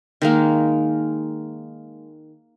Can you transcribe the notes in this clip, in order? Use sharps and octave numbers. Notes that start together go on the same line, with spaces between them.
D#3 G#3 A#3